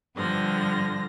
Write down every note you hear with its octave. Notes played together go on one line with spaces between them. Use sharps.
G2 D3 F3 A#6